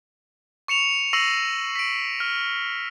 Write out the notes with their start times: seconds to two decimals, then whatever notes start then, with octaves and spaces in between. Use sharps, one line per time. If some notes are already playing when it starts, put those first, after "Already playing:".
0.68 C#6 C#7 E7 F7
1.13 C#6 E6 A#6 C7 D#7 F#7
1.76 B6 D7
2.20 F6